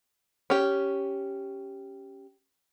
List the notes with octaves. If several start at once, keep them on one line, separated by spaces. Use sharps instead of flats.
C#4 G4